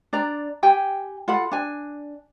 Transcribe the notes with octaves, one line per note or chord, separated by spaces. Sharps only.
D4 D5 A#5
G4 G5 G#5
F4 A4 F#5 B5
D4 G#5